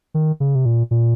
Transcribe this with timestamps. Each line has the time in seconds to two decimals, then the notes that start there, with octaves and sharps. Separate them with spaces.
0.14 D#3
0.40 C#3
0.55 C3
0.66 A#2
0.91 A#2